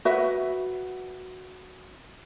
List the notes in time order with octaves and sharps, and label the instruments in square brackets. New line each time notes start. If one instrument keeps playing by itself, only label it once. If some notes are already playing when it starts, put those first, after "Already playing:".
[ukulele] F#4 B4 E5